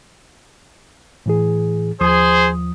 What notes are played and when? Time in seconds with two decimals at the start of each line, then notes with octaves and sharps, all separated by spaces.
1.26 A2 E3 G#4
2.01 D#2 F3 G#4 C5 D#6